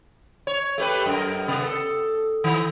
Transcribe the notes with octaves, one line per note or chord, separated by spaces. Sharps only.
C#5
A3 G4 B4
F#2 A#4
C3 B3
A4
D#3